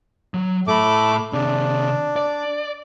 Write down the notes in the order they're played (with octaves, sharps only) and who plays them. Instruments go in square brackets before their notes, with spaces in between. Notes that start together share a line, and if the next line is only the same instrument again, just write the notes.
[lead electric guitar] F#3
[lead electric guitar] A2 B5 [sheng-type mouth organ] A3 D6
[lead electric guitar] C3 G#4 [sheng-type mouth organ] D4
[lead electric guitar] D5